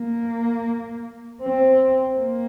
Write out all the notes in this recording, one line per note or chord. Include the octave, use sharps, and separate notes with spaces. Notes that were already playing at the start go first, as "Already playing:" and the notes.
Already playing: A#3
C4
A#3